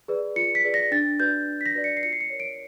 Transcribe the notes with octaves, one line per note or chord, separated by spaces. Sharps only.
G#4 B4 D5
F4 C#7
B6
G#4 B4 D5
A#6
D4 A6
F#4 B4 D5 G6
D4
B6
A#6
F#4 B4 D5
C#7
C7
F4 C#7
C7
C#7
A#4 C#5
D7